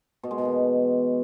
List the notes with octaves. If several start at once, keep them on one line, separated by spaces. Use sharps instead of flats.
B2
G#3
B2
E3